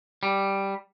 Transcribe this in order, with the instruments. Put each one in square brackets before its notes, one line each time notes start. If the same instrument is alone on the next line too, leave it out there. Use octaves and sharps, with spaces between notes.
[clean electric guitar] G3